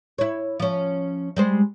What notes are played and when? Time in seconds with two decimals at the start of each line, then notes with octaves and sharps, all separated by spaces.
0.18 E4 C#5
0.60 F3 C#4
1.37 G3 G#3 C5